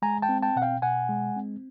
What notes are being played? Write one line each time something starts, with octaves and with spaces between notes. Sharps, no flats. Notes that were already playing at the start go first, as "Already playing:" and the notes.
G#3 G#5 A#5
G5 A5
C4
G5 A5
B2 F#5
F5 G5
B2 F#5 G#5
G#3
C4